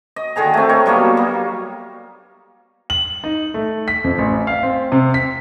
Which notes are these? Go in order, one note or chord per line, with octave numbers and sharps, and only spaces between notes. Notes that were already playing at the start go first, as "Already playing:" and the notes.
D#5
D3 D#3 G#4 A#5
A3 C4
A#4 C#5 D#5
F#3 G3 A#3 B3
A#3
F#7
D#4
A3
B6
F2
A1
F5
C4
C3
B6